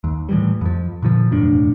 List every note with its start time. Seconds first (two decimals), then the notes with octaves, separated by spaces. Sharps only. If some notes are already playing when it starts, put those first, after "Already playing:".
0.04 D#2
0.29 A2 E3 G3
0.61 F2 F3
1.02 A#2 D3 D#3 F3
1.31 E1 F#2 A2 D4